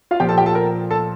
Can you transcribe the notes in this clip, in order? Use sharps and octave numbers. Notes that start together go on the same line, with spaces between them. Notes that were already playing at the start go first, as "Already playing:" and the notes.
F4 F5
A#2 F3 G4 G5
A4 A5
G4 G5
A4 A5
A#4 A#5
A4 A5